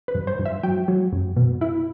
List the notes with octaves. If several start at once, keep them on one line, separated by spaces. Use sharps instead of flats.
B4
G2
C5
G2
E5
F#3 G5
F#3
F#2
B2
E4